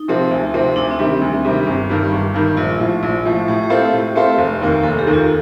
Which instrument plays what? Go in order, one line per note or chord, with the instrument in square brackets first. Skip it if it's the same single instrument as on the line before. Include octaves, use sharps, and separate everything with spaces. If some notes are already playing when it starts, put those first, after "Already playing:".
Already playing: [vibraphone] D#4
[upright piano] C3 F3 C4
D2
C3 F3 C4
[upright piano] D2 [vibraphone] D4
[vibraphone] C4
[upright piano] C3 D#3 G3
[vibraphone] D4
[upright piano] D2
C3 D#3 G3
G1
G2 D#3 G3
G1
G2 D#3 G3
[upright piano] A#1 [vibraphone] F4
[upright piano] A2 F3
A#1
A2 F3
[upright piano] A2 [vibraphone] G4
[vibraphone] G4
[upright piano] A3 C4 F4 C5
A2
A3 C4 F4 C5
F1
D#2 D#3 A#3
[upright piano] F1 [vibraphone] A4
[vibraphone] G4
[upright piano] D#2 D#3 A#3
[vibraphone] F4